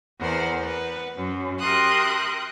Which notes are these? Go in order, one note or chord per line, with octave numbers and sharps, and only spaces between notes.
E2 B3 A#4 C5 D5
B3 B4
F#2
G4 A#4 E5 C6 D#6 F#6